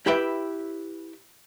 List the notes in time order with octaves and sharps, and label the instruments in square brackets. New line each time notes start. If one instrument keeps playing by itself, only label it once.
[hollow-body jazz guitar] E4 G4 B4 E5 G5